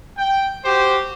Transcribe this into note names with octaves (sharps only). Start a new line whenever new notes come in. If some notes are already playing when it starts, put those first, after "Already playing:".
G5
F#4 G4 C5